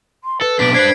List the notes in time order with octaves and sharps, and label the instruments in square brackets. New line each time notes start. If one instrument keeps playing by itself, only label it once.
[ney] C6
[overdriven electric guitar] A4 [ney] B4
[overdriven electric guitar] B1 D4 [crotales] B6 D7
[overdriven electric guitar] D4 B4 [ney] C5 [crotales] G#6 C7